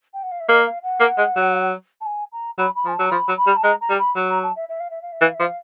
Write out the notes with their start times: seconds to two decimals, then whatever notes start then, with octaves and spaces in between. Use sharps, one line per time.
0.14 G5
0.23 F#5
0.31 F5
0.40 E5
0.48 A#3 D#5
0.66 F5
0.83 F#5
1.00 A#3
1.18 G#3
1.36 F#3
2.01 A5
2.06 G#5
2.32 A#5
2.58 F#3 B5
2.75 B5
2.85 F3 G#5
2.93 A5
2.99 F#3
3.06 A#5
3.11 F3 B5
3.28 F#3
3.37 B5
3.46 G3
3.57 A5
3.63 G#3 A#5
3.81 A#5
3.89 G3
3.99 B5
4.16 F#3
4.29 A#5
4.43 A5
4.56 E5
4.69 E5
4.80 F5
4.90 E5
5.02 F5
5.12 E5
5.21 E3 F5
5.34 E5
5.40 F3
5.46 F5